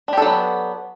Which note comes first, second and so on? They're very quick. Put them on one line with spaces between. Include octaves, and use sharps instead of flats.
D4 G4 A4 F#3 B3